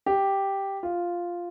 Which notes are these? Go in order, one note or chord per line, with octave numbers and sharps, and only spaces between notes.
G4
F4